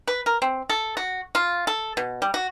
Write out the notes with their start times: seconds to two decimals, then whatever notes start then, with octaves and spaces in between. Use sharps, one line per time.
0.08 B4
0.26 A#4
0.42 C4
0.70 A4
0.97 F#4
1.35 F4
1.67 A4
1.97 B2
2.22 G3
2.34 F#4